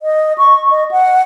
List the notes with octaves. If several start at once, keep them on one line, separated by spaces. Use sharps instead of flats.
D#5
C#6
D#5
F#5